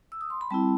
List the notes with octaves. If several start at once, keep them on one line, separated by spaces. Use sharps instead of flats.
E6
D#6
C6
B5
G3 C4 E4 A5